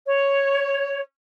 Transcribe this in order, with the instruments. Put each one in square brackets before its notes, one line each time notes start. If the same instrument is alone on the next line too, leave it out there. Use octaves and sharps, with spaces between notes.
[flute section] C#5